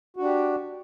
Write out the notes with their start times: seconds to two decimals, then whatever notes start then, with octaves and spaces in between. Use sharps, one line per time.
0.16 F#4
0.20 D4
0.24 G4